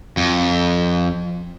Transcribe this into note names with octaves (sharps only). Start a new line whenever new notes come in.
F2